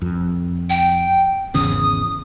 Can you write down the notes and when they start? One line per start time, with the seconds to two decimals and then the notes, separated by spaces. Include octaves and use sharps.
0.02 F2
0.70 G5
1.54 G#1 E2 C#3 D#6